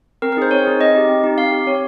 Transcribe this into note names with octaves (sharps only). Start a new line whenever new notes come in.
C4 A#4
A#4
D#4 G#4 C5
C4 C#5
D#4 G#4
C4 D#5
D#4 G4
C4
D#4 G4
C4 F5
G4
C4 C#5